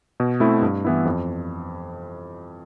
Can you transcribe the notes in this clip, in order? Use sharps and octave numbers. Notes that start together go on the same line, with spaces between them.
B2
A3 C4 E4
G2
E3 B3 E4
F2